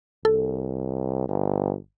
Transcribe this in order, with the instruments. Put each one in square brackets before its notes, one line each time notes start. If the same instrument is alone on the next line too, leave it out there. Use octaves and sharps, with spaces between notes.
[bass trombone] C2 [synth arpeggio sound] A4
[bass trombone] G1